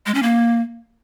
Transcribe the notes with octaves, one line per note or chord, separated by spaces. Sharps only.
G#3
C#4
A#3